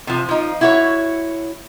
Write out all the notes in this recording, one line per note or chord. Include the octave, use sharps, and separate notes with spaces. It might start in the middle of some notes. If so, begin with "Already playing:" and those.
C3 F3
F3 D#4
E4 F#4 C#5